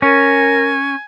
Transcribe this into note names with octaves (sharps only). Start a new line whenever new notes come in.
C#4 A#4 G#5